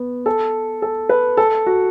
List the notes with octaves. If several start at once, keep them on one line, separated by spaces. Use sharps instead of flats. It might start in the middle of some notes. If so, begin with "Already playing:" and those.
Already playing: B3
A4
A4
B4
A4
F#4